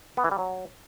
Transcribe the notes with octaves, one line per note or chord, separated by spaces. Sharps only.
B3
E3
G3
F#3